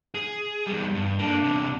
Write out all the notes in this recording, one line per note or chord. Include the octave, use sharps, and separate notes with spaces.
G#4
E2 G3
G2
A#3 D4 A4
E2 C3